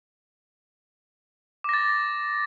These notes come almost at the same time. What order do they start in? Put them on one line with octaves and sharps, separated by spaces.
D6 A#6 A6